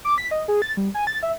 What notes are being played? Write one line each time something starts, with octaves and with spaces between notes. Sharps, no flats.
D6
B6
D#5
G#4
A6
G3
G#5
A6
E5